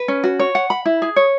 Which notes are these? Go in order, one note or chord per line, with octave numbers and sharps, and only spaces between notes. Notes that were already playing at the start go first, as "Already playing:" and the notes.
Already playing: B4
C#4
F#4
C#5
F#5
B5
E4
G#4
C#5